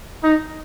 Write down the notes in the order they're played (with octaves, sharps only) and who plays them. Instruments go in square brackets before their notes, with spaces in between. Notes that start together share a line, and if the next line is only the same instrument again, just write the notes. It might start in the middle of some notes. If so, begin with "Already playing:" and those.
[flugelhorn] D#4